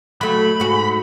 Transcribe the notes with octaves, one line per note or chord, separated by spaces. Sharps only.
F#3 A3 B5
G#2 F#4